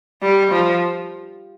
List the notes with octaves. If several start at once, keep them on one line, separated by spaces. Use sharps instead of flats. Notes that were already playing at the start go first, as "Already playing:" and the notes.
G3
F3